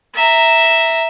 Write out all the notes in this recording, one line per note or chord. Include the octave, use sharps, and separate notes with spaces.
E5 A#5